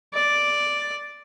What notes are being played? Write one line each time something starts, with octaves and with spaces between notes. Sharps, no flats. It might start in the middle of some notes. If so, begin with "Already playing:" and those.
D5